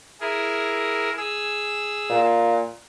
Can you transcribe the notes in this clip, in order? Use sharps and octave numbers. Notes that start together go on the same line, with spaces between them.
E4 G#4 A#4
G#4 E6
A#2